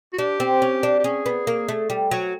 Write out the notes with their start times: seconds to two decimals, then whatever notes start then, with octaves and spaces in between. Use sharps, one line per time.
0.13 F#4
0.18 D4 G4
0.40 C4
0.62 C#4
0.83 D4
0.99 G4
1.04 C#4 G#4
1.26 B3
1.47 A#3
1.69 A3
1.90 G3
2.11 F#3